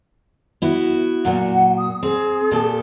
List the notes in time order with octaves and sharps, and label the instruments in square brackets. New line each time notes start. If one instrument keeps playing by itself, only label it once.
[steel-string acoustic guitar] B3 E4 F#4
[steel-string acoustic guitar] A#2 F#3 [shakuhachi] F#5
[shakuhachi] D#6
[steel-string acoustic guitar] C4 [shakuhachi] G#4
[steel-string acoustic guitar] A#2 G4 A4